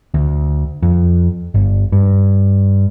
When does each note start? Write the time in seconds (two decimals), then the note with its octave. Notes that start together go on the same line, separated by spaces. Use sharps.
0.14 D2
0.82 F2
1.54 G1
1.92 G2